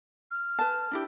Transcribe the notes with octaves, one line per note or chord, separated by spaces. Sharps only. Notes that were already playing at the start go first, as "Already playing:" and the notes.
F6
B4 A5
D4 E4 G4